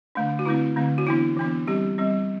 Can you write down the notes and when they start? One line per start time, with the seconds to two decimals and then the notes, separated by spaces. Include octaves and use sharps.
0.15 D3 A3 D4
0.39 F#4
0.46 D3 A3 C4 E4
0.76 D3 A3 C4
0.98 F#4
1.06 E3 B3 D4 E4
1.37 E3 B3 D4
1.67 G3 C4 G4
1.98 G3 C4